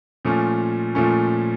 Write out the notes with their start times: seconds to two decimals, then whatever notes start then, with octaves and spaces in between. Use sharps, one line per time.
0.25 A#2 F3 A3 C#4
0.95 A#2 F3 A3 C#4